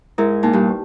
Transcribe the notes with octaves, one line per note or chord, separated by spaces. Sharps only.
G#2 E4 A#4 E5
A#2 D#4
G2
G4 B4